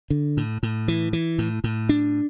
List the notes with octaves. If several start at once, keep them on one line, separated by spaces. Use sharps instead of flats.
D3
A2
A2
E3
E3
A2
A2
D4